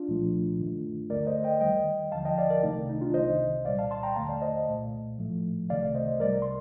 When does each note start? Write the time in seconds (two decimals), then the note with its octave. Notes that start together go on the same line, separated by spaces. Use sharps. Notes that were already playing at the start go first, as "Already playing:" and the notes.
Already playing: D4 F4
0.08 C2 A#2 F3 A3
0.59 G2 D#3 A3
1.10 D2 D3 A3 A#4 D5
1.27 C5 D#5
1.44 D#5 G5
1.61 F2 D#3 G3 D#5 G5
2.12 D#2 D3 F3 F5 A5
2.25 D#5 G5
2.38 D5 F5
2.50 A#4 D5
2.63 C2 C3 D#3 A3 D#4
2.89 D#4
3.01 D4 F4
3.14 C2 C3 D#3 C5 D#5
3.65 C2 A#2 G3 D5 F5
3.79 F5 A5
3.91 A5 C6
4.03 G5 A#5
4.16 D#2 D3 A3 F5 A5
4.29 D5 F5
4.42 C5 D#5
4.67 C2 A#2 A3
5.18 A2 F3 A3
5.69 C2 C3 D#3 A3 D5 F5
5.95 C5 D#5
6.20 C2 C3 G3 A#4 D5
6.42 C6